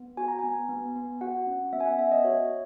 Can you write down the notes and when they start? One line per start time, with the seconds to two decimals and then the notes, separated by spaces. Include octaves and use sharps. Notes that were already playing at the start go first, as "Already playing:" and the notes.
Already playing: B3
0.17 F#4 G#5
0.28 A#5
0.39 B3 G#5
0.69 B3
0.96 B3
1.21 F#4 F#5
1.47 C#4
1.73 B3 E5
1.80 G#5
1.85 F#5
1.98 B3 E5
2.12 D#5
2.24 F#4 C#5